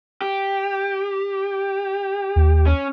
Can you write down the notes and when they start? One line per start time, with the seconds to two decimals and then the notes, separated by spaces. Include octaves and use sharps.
0.22 G4
2.36 D#2
2.67 C#4